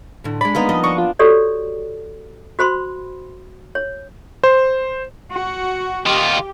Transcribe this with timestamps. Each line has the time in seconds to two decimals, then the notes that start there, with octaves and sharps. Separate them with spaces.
0.24 A2 D3
0.41 G#3 D5 B5
0.55 A#3 B3 D#4
0.69 F3 D#5
0.84 D4 C#6
0.98 F4
1.19 F#4 G4 A4 C#5 D5
2.59 F#4 C5 B5 C6
3.75 C#5
4.44 C5
5.31 F#4
6.06 D#3 F4 G4